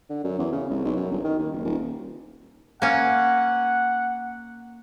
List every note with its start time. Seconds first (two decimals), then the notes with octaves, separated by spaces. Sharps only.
0.10 D3
0.24 F#2
0.39 E2
0.52 C#3
0.70 C2
0.85 B1
0.96 F#2
1.12 G1
1.24 D#3
1.39 D#2
1.52 F#1
1.65 D#1
2.82 A#3 C#4 F#5